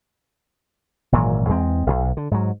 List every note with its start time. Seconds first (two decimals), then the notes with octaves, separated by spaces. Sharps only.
1.12 G#1 A#2 E3 F#3
1.49 E2 G#3 C4
1.86 E1 B1
2.17 D3
2.31 G#2 F#3